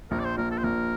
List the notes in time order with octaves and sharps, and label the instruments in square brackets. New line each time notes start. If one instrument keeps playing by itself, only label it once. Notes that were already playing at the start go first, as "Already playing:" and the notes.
[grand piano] A#1 [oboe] A#4
[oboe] D5
C5
[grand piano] A#2 [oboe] A#4
[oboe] A4
C5
[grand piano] A#1 [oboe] A#4